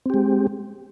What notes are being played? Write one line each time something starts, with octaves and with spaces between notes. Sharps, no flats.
G#3 C4 G4